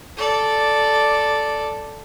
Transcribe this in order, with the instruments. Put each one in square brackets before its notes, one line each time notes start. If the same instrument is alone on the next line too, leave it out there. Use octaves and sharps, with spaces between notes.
[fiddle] A4 D5